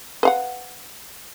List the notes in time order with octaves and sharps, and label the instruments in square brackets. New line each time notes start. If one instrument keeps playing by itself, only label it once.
[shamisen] B4 F5 F#5